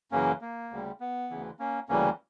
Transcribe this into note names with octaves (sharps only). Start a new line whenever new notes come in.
F#2 C#3 E3 A#3 C#4
A#3
D2 C#3 G3
B3
D2 C#3 E3
A#3 C#4
D2 C#3 E3 G3 A#3 C#4